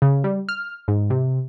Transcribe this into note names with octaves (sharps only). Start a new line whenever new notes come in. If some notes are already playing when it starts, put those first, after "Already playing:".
C#3
G3
F6
G#2
C3